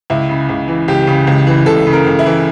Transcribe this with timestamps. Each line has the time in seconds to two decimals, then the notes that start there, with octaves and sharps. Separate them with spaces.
0.10 C#2 E4
0.29 C#3
0.49 C#2
0.68 E3
0.88 C#2 G4
1.07 C#3
1.27 C#2
1.47 E3
1.66 C#2 A4
1.87 C#3
1.93 A#4
2.06 C#2
2.19 E4
2.26 E3